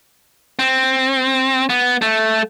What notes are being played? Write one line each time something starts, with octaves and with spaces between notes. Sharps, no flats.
C4
B3
A3